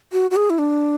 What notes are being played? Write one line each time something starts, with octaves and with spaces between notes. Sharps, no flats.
F#4
F#4
G#4
E4
D4